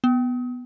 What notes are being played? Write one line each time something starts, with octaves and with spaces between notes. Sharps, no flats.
B3